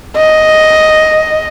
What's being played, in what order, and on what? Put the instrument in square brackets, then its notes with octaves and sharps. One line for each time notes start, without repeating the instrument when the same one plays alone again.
[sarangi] D#5